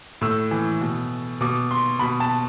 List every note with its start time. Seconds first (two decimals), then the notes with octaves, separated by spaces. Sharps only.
0.21 A2 E6
0.51 E3
0.81 B2
1.41 B2 D6
1.71 C6
1.99 B2 B5
2.20 A5